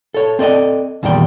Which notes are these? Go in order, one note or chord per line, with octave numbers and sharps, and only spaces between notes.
A4 C#5
C4 A4 D5 D#5
E2 A#2 D#3 G3 G5